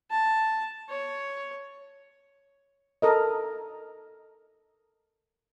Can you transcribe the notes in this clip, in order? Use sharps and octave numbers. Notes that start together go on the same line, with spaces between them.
A5
C#5
A4 A#4 D#5